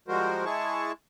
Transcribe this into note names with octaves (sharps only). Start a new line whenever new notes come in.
F3 G3 G#3 F#4 A#4 C5
G#3 E4 G#4 A5 C#6